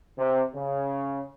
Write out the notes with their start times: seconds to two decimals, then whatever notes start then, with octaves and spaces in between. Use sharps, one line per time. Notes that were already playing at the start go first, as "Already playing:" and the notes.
0.18 C3
0.55 C#3